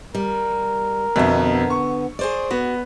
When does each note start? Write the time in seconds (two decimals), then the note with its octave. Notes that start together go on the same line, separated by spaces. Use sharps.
0.15 G3 A#4
1.16 F2 B2 D3 B3 E5
1.70 C#6
2.19 G#4 C5 D5
2.51 B3 F#4